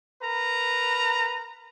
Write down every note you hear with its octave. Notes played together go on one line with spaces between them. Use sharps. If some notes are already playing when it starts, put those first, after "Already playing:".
A#4 B4 A#5